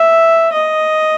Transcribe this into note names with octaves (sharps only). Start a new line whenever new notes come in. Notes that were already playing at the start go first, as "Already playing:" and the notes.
Already playing: E5
D#5